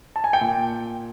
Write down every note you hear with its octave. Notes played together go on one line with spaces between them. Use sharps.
A5
G#5
G5
A#2